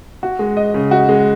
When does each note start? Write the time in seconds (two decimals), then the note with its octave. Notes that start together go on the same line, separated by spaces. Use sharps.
0.23 F#4
0.39 G#3
0.57 D#5
0.74 C#3
0.91 F#4
1.09 G#3